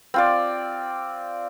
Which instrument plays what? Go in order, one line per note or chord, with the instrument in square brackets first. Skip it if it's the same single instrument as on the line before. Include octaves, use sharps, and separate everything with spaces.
[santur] C4 F4 D5